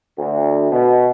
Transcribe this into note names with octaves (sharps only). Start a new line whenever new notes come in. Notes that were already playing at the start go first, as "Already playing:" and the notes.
D2
B2